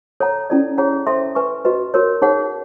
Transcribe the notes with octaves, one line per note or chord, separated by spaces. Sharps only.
A4 C#5 F#5 A#5
C#4 E4 A4 D5
G#4 C#5 F#5 A#5
A4 C5 E5 G5 C6
B4 E5 G#5 C#6
F#4 B4 D#5
F#4 A#4 C#5
D#4 G#4 C#5 F#5